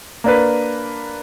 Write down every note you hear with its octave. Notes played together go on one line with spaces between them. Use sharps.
A#3 D4 B4